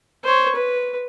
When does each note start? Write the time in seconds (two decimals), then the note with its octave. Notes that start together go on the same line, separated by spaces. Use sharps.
0.24 C5 C#5
0.55 B4